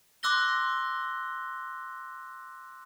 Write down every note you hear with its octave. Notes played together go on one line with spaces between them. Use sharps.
C6 D6 E6 F#6 A#6 G7